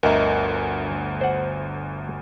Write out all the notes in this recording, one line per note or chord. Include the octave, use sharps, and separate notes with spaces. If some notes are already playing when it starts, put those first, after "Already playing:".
G1 D2 A#4 D#5 E5
C5 F#5